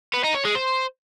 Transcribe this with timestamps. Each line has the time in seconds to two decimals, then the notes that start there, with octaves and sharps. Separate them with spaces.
0.14 B3
0.24 D#4
0.35 C#5
0.45 G#3
0.55 C5